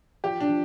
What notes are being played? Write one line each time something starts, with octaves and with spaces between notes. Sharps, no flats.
F3 G4
D4
F3